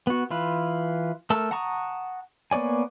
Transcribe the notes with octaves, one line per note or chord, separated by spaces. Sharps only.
B3 F#4
E3 F4 B4
A3 A#4 A5 E6
F#5 A5 A#5 C#6 D#6
A#3 B3 C#5 D5 G#5